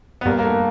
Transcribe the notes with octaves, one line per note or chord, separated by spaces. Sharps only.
B3
G2 A#3
A#3
A3